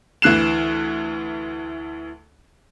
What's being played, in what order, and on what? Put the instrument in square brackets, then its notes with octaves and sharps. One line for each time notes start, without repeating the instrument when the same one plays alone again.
[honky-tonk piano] D2 E3 F#6 C7 E7